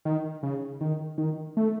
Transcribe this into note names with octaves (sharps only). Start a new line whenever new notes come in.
D#3
C#3
D#3
D#3
A3